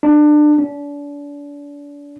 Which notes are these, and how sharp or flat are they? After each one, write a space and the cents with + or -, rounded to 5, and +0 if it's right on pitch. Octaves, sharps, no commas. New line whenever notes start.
D4 +25
D4 -35